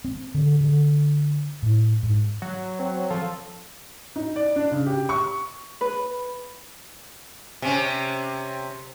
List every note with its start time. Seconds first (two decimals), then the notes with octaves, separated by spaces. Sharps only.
0.05 C4
0.34 D3
0.61 D3
1.63 A2
2.03 G#2
2.42 F#3
2.79 C4 C#5
3.10 F3 A4
4.16 D#4
4.36 D5
4.56 D4
4.71 C#3
4.86 G4
5.09 C#6
5.81 B4
7.62 C3 C#4